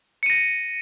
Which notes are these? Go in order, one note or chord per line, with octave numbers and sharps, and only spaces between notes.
A#6 C#7 D#7